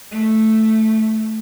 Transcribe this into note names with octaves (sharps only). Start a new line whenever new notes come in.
A3